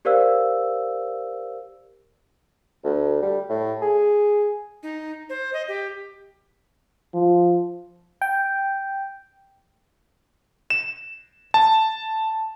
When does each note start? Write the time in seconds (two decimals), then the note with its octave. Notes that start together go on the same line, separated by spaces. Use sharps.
0.05 G4 A#4 C5 D5 F5 E6
2.84 D2
3.22 G3
3.50 A2
3.82 G#4
4.83 D#4
5.30 C5
5.53 D#5
5.68 G4
7.14 F3
8.22 G5
10.70 E7
11.54 A5